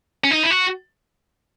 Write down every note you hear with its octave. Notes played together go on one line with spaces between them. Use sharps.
C#4
D#4
E4
F#4